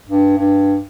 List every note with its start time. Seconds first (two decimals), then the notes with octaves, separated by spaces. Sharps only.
0.08 G2
0.37 G2